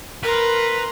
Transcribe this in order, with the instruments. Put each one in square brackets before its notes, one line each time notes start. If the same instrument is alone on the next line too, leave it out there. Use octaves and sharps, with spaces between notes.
[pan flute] A#4 [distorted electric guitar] B4 [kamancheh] A#5 C6